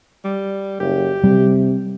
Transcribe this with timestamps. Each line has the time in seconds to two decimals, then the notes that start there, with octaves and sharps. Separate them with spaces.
0.24 G3
0.80 F#1 G4
1.24 C3 G3